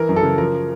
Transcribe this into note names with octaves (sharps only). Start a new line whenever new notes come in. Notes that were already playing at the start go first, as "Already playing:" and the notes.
Already playing: E3 A#4
F#2
A4
C#3
F3 A#4